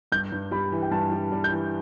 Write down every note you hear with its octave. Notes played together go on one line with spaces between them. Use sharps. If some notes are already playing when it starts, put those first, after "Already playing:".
G2 G6
G2
G3 B5
E3
G5
G2 A5
G3
G3
G6
E3